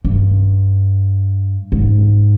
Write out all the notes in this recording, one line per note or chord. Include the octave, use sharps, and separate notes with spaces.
G2
G#2